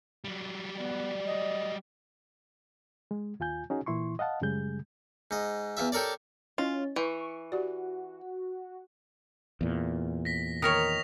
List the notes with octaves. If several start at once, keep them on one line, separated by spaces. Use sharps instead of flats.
F#3 G3
B3 D5
D#5
G#3
D#2 F4 G#5 G6
C#4 D#4 F#4 G#4
A#2 E3 E4 C6 C#6
D#5 F5 F#5 A5
F#2 C#3 G3 G#3 G#4 G6
G#2 D#5
E2 F4 E5
G4 A4 A#4 C#5 D5
C#4 E4 F4 C#5 D#5
E3 E4 B4 C#6
F#4 G4 D5
E2 A#2
A#6 B6
D#3 A#4 C#5 D#6 A#6 F7